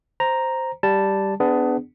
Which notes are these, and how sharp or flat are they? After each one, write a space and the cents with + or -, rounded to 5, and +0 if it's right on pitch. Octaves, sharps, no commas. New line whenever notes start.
C5 +0 A#5 +0
G3 +0 A5 +0
B3 +25 D4 +0 G#4 +0